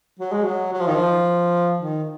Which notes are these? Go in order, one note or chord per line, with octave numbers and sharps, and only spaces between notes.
F#3
G#3
F#3
F#3
F3
D#3
F3
D#3